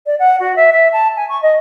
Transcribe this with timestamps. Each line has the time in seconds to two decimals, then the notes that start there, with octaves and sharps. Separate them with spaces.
0.06 D5
0.19 F#5
0.40 F#4
0.56 E5
0.72 E5
0.92 A5
1.16 G#5
1.29 C#6
1.42 D#5